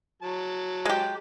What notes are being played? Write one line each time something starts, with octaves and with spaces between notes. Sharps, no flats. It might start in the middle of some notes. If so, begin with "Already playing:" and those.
F#3 A5
G#3 G4